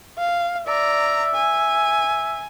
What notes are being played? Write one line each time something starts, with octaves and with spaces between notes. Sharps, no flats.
F5
D5 E5 A#5
G#5